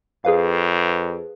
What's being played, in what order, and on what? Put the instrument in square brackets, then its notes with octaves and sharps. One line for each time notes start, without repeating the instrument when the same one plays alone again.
[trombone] F2 [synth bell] G#4 B4 F5